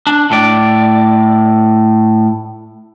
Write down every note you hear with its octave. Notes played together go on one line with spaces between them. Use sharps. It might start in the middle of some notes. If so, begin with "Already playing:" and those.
D4
A2 D5